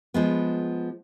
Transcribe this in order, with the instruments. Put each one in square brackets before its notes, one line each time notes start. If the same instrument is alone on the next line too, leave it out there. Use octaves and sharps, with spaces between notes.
[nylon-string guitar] F3 G#3 B3